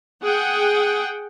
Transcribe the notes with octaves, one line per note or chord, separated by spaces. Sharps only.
G#4 F#5 G5